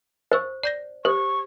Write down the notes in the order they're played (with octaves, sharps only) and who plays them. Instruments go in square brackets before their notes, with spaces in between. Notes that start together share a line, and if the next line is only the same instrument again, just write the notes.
[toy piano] C5 [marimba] C#6 E6 A6
[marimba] D5 G6 A#6
[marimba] G4 D#6 [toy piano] C5 [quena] C#6